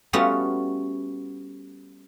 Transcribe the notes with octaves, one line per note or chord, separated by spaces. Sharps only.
G3 A3 B3 C#4 F4 F#4